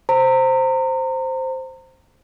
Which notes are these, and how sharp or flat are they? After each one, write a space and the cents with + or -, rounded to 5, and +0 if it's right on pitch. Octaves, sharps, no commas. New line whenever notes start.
C5 +0 A#5 -30